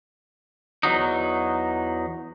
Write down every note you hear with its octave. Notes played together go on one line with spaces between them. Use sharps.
E2 F#3 D#4